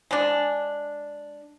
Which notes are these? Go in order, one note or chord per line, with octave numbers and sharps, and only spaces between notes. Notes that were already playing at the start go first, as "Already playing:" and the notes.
G#3 D4